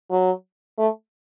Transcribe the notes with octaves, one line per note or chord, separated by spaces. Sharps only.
F#3
A3